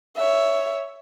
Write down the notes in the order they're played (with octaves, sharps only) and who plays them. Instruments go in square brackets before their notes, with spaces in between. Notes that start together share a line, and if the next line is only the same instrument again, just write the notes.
[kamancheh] C#5 E5